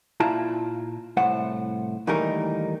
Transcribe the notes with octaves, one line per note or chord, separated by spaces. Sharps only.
A#2 E4 F4 A5 A#5
C2 A2 C5 F#5
D#2 E3 G3 A3 D#4 A#4